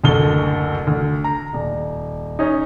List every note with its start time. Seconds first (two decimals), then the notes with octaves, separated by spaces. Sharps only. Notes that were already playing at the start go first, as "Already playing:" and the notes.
0.04 F#1 D2 A4 G7
0.87 D2
1.24 A#5
1.53 D#1
2.39 C#4 D#4